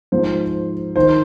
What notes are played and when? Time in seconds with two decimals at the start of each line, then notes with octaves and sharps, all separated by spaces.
0.12 G#2 F3 C5
0.96 D#3 C5